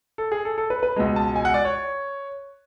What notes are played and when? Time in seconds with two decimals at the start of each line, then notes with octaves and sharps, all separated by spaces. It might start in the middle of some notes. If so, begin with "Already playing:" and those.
0.18 A4
0.32 G#4
0.45 A4
0.58 A4
0.70 B4
0.83 B4
0.96 C#2 B2 G#3
1.16 A5
1.36 G#5
1.45 F#5
1.54 D5
1.65 C#5